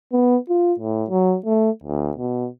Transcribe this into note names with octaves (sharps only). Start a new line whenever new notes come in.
B3
F4
A2
F#3
A3
D2
B2